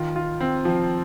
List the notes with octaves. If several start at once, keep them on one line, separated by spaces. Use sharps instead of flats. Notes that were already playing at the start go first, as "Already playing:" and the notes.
Already playing: D#3 F4
F4
C4
F3